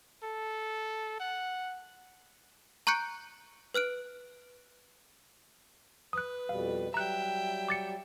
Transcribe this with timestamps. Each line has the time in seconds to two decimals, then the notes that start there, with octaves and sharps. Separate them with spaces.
0.23 A4
1.20 F#5
2.87 A#5 C#6 F#6 G6 C#7 D7
3.74 B4 F6 F#6 D7
6.13 B4 D#6 F#6
6.49 F2 B2 G3 F5
6.94 F#3 G3 E5 G5 A#5 F#6
7.68 D6 A6 C#7